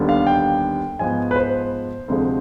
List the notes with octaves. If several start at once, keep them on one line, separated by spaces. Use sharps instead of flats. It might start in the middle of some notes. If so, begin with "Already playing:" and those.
Already playing: D#2 D3 G3 B3
F5
G5
G#2 F3 B3 G#5
B4
C5
D2 C3 F3 G#3